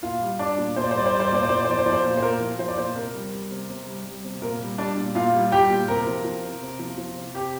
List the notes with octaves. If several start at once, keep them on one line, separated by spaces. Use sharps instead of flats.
A#2 F4 F5
G3
G3 D4 D5
A#2
A#2 C5
D5
C5
G3 D5
C5
G3 D5
C5
D5
A#2 C5
D5
A#2 C5
D5
C5
F3 D5
C5
F3 D5
C5
A#2
C5
A#2 A#4
F3
F3 C5
D5
A#2 C5
C3 A#4
G3
G3
C3
C3
G3
G3
C3
A#2 A#4
G3
G3 D4 D5
A#2
A#2 F4 F5
G3
G3 G4 G5
A#2
C3 A#4 A#5
F3
F3
C3
C3
F3
F3
C3
C3 G4 G5